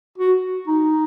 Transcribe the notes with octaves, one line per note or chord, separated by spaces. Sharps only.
F#4
D#4